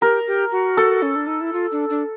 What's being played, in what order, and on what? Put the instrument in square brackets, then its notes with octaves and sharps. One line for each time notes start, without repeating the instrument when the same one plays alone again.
[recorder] G4 [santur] A#4
[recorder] G4
F#4
[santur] A4
[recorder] C#4
D4
D#4
E4
F4
D4
D4